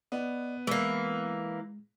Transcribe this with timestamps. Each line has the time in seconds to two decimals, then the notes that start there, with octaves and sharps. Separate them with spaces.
0.12 B3 B4 D5 D#5
0.67 E3 G#3 A#3